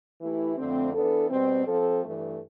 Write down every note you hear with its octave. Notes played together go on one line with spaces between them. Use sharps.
E3 A3 E4 G4
F2 D3 A3 C4
E3 B3 D4 A4
B2 G3 C4
F3 C4 F4 A4
G2 E3 A3